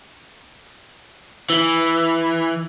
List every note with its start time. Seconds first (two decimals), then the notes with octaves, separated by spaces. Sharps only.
1.50 E3